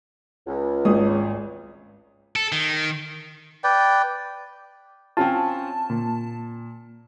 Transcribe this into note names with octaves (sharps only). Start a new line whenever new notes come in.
C#2
G#1 G#2 D#6
A4
D#3
B4 D5 G5
C4 C#4 F4 A5
A#2